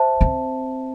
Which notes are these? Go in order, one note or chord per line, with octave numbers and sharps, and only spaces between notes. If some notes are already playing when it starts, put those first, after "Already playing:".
Already playing: C5 E5 A5
C4